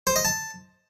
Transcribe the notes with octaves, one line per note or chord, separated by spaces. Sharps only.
C5
D#5
A5